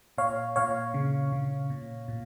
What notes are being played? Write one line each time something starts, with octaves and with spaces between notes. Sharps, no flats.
A#2 C#5 F5
A#2 C#5 F5
C#3
C#3
A#2
A#2